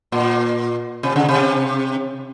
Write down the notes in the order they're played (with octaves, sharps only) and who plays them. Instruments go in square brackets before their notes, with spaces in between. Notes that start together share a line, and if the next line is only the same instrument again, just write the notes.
[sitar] A#2
C3
C#3
C3